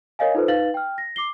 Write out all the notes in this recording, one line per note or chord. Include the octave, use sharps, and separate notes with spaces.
A#4 C#5 D#5 F5 G#5
D#4 F4 A4 B4 C5
D#4 B4 F5 A6 F#7
G5 F6
A#6
D6 C7 G7